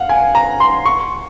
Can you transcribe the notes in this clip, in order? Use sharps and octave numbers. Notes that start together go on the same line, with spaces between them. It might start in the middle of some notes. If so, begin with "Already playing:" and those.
Already playing: F5 F#5
G#5
A#5
C6
C#6